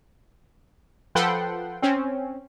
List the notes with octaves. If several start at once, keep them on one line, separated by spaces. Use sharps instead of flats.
F3 A4 B4 F#5 G5 C6
C4 C#4